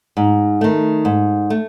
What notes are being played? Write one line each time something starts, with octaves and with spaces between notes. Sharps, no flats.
G#2
D#3 A3
G#2
A3